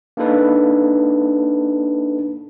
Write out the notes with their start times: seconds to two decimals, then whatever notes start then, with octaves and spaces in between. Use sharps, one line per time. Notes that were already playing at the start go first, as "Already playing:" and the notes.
0.17 A#3 D4 D#4 A4 B4